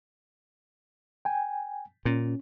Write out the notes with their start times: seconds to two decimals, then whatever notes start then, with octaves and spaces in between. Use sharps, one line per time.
1.25 G5 G#5
2.05 A#2 C#4